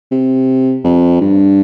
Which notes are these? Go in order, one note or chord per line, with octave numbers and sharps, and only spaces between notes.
C3
F2
G2